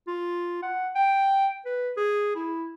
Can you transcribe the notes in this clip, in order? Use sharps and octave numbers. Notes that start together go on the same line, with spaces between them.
F4
F#5
G5
B4
G#4
E4